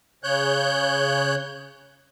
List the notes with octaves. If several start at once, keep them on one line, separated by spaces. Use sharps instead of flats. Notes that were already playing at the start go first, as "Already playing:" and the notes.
C#3 C#5 F#6 G6